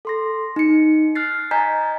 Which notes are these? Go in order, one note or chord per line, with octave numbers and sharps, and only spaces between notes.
A4 C6 A#6
D#4 C#7
F6 F#6 A6 C7
D#5 G#5 A#5 G6 A6 B6